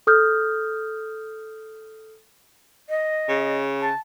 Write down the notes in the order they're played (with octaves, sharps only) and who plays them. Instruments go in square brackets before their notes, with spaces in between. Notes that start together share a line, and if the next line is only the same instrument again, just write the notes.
[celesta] A4 D#6 F6 G6
[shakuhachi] D#5
[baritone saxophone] C#3
[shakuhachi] A5